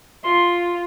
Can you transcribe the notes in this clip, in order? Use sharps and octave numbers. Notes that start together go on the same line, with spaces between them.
F4 C6